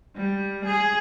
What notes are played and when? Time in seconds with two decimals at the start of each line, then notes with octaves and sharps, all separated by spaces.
0.16 G3
0.65 G#4